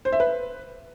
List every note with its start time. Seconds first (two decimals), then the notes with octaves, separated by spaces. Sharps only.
0.05 C5
0.12 E5
0.20 B4